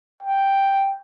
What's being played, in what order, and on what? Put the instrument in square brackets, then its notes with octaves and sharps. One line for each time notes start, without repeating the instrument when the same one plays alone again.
[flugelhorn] G5